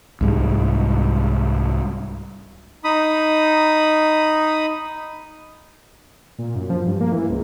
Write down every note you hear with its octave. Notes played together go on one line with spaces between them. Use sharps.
C2 G#2 G3
D#4 B5 D#6
A#2
F#2
F3
G2
A#3
E3
C#2